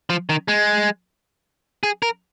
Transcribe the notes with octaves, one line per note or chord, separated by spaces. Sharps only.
F3
D#3
G#3
G#4
A#4